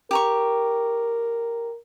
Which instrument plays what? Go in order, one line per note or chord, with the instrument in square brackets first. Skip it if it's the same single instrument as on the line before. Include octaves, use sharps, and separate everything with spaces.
[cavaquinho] G4 A#5 C#6 [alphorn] A#4